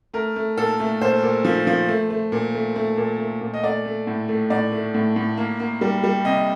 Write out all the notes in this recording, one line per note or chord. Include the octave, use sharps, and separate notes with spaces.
A3 A#4
A3
A#2 A4
A3
A#2 C5
A#2
F3
F3
A3
A3
A#2
A3
A3
A#2
A3
A#2
D#5
A3 D5
A3
A2
A3
A2 D5
A3
A2
A2
A#3
A#3
G3
G3
C3 D#5